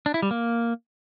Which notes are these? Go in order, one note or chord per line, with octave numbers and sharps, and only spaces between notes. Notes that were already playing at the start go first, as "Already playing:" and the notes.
D4
E4
G3
A#3